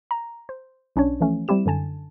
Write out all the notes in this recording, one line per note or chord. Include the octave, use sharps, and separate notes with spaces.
A#5
C5
B1 C#4 D4 C#5
E3 F3 A3 C#4
G3 C4 E4 G4 E7
F#2 D3 G#5 A5